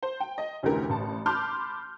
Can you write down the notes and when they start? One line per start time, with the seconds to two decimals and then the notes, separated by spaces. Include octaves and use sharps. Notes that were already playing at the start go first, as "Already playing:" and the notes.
0.03 C5
0.20 G5
0.38 D#5
0.63 F1 D2 E3 C#4 G4 A#4
0.89 A1 A5
1.26 A5 B5 C6 D6 F6 G6